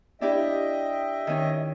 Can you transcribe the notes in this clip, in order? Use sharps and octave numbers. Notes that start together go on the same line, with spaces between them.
D4 E4 G4 D#5 E5 G5
D#3 C#4